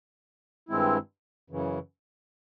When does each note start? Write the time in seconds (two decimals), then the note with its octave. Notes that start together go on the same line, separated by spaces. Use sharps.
0.69 G2 D#3 G#3 C4 E4
1.50 F#2 C#3 E3